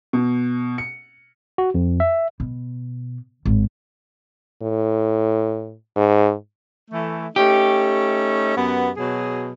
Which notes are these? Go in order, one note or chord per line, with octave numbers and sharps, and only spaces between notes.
B2
C#7
F#4
F2
E5
B2
G#1
A2
G#2
E3 A3
A3 C#4 D#4 G4
F#2 B3
B2 F#3 G#4